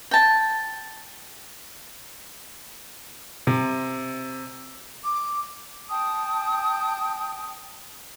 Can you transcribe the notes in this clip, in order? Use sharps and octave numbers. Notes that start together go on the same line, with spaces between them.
G5 A5
C3
D6
G5 A5 D#6